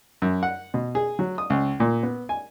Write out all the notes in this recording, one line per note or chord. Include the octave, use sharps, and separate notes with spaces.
F#2
F#5
B2
G#4
F#3
D#6
C#2
A#2
B3
G#5